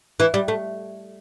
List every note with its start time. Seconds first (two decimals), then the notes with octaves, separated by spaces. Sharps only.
0.20 E3
0.34 G3
0.48 A3